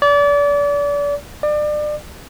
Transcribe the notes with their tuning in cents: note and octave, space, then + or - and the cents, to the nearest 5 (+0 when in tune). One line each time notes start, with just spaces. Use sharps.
D5 -35
D5 +30